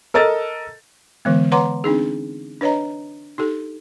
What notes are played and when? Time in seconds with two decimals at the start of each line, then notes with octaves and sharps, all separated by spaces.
0.14 A4 A#4 D#5 E6 A6
1.25 D3 E3 G#3 B3
1.52 B4 C#5 F#5 A#5 C6 D6
1.84 C4 D4 D#4 G#4
2.61 D4 B4 C#5 D#5 A#5
3.38 D#4 G4 A4